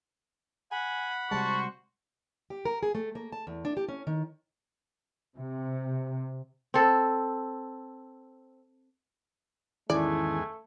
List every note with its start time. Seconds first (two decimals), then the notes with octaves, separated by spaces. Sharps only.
0.72 F#5 G#5 B5
1.31 C3 G3 G#3 F#4 C5 A5 C#6
2.50 G4
2.65 A#4
2.83 G#4
2.95 A3
3.15 A#3
3.32 A5
3.47 E2
3.65 D4
3.77 G4
3.89 C#4
4.07 D#3
5.36 C3
6.74 C4 A4
9.90 E2 G#2 D#3 A3 C#4 E4 D5 G#5